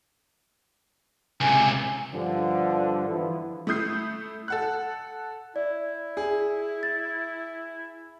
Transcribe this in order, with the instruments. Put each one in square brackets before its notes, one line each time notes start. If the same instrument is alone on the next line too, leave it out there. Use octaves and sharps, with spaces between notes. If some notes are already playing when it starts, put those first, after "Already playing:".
[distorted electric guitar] C#2 C3 [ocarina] G#5
[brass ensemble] G2 D3 F3
E3 F3 B3 E4
[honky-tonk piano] A3 E4 D#6 G6 C7
A4 F#5 F#6
[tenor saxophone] E4 [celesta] D5
[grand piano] G#4
[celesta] A6